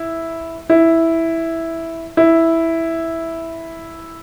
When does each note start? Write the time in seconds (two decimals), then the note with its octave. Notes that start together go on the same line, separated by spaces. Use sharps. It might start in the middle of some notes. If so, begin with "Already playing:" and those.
Already playing: E4
0.70 E4
2.17 E4